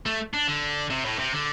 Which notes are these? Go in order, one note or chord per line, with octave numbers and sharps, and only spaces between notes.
A3
D4
D3
C3
A2
C3
D3